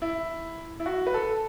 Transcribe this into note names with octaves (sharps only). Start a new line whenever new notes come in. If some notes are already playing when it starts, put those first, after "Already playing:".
E4
E4
F#4
B4
A4